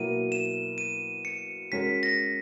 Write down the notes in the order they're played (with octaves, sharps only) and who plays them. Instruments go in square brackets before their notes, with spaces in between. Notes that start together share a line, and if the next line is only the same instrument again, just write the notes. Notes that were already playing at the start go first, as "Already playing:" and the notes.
Already playing: [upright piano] B2 F#3 A#3 E4 [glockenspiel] D#7
[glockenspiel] E7
D#7
C#7
[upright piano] G#3 C#4 F#4 A#4 [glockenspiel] B6
[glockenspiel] A#6